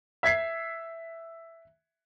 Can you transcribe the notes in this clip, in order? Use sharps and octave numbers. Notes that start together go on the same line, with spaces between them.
E5 G#6 B6 C7